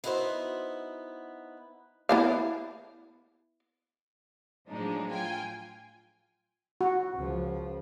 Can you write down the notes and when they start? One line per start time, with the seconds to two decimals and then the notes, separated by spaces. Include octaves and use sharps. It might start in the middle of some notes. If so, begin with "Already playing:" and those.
0.04 B3 D#4 E4 F#4 G4 C5
2.09 B3 E4 F5
4.70 A2 F3 F#3 G#3 D4 D#4
5.11 F4 G5 G#5
6.81 F#4
7.15 C#2 F3